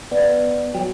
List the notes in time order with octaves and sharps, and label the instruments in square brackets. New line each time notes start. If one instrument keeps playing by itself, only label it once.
[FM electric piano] B3 [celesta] D5
[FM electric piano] F#3 [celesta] G5